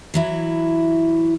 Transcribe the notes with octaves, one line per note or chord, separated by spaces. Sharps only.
E3 F#3 E4